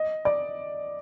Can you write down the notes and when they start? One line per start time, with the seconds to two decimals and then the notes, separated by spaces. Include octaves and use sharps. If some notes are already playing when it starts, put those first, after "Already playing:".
Already playing: D#5
0.25 D5